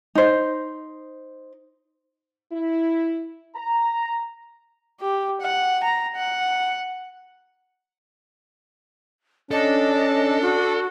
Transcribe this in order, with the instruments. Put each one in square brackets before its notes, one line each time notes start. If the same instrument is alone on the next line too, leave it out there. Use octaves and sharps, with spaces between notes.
[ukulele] D#4 C5
[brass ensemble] E4
A#5
[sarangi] G4
F#5
A#5
F#5
[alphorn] C#4 [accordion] D4 [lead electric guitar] A4 [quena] D#5
[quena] F#4